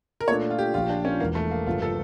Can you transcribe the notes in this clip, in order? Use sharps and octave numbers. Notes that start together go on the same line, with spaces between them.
A#4
A#2 A3 D4 C#5
F4
G4
A#1 A#2 F3 F4
D4
C#4
E1 E2 E3 A#3
A3
A#3
G1 F2 C#3 F4
A4